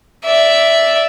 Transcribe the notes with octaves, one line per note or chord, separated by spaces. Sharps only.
D5 E5